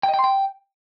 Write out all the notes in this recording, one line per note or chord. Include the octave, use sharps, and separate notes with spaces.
G5
D#5
G5
C6
G5